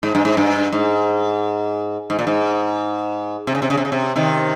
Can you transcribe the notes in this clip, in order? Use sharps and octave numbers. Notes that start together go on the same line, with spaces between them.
G#2
G2
G#2
G2
G#2
G#2
A#2
G#2
C3
C#3
C3
C#3
C3
C#3
C3
C3 D#3